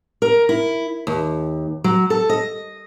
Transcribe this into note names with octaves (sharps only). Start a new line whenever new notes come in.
A#4
E4
D#2
F#3
A4
D#5